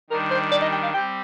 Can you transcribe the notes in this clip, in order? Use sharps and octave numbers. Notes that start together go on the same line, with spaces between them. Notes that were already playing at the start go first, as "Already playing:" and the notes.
D#3 G3 D4 A#4
C5
D5
D#5
G5
F5
G3 C4 G4 G5